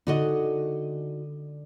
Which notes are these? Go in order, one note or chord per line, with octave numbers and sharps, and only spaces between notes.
D3 G#3 D#4 F#4 D#5